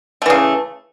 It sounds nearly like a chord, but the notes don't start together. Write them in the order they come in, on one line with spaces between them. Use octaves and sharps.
A3 E3 C#3